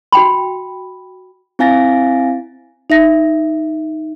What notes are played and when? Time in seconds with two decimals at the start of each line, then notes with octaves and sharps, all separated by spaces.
0.12 F#4 G5 B5
1.59 C4 E4 F5 G#5 A6 A#6
2.90 D#4 E5 A#6